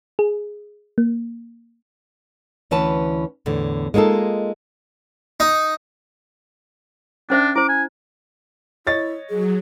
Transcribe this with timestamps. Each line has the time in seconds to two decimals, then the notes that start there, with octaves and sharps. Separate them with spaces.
0.19 G#4
0.98 A#3
2.71 D2 E3 C#4 B4 A5
3.46 E2 A2 D3
3.94 G#3 A#3 D#4 F4 A4
5.40 D#4
7.30 C#4 D4 C5 E5
7.56 E4 C5 D6
7.69 G#5
8.87 E4 C#5 D#5 A6
9.30 F#3 G#4